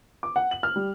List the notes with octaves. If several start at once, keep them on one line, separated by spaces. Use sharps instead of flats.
D6
F#5
F#7
F6
G3